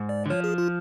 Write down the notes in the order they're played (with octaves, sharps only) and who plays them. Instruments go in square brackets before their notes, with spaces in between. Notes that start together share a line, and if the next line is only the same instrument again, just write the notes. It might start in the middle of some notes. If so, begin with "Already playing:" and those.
Already playing: [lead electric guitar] G#2
[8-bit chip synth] D5
[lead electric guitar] D3
[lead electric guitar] F3 [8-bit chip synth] C#5
[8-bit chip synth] G#4
F4